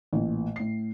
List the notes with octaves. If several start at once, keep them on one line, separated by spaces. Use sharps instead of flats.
A1 A#2
A2 C7